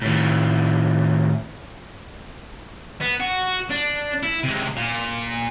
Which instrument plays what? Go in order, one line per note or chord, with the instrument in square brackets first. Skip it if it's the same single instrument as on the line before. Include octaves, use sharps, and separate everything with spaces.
[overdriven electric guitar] A2 D#3
[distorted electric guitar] B3
F#4
D4
E4
C3 G#3
A#2